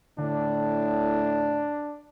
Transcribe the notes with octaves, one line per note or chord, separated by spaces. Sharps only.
A2 D3 D4